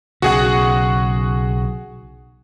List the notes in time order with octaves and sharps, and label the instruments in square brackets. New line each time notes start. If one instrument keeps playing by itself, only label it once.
[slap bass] B1 C#3 [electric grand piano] F#4 G#4 F#5